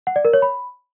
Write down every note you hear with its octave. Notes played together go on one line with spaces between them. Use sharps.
F#5
D5
A#4
C#5
B5